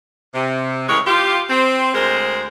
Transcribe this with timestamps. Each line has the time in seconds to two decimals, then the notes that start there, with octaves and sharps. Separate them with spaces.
0.35 C3
0.89 A2 C#3 E3 G#3 A#4 C#5
1.06 F4 G4
1.50 C4
1.94 D2 G#3 A#4 C5